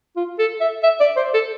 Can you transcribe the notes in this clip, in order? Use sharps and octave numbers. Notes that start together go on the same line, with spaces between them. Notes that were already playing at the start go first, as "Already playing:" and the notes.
F4
A4
E5
E5
D5
C5
A4